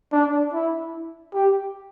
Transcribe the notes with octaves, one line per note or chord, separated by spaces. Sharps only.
D4
E4
G4